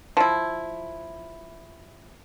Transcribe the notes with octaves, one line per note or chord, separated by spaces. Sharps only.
F3 E4